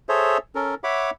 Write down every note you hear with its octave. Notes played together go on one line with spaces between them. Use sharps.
G#4 A4 C5 C#5 E5
C#4 A4 A#4
C#5 E5 F#5 B5 D6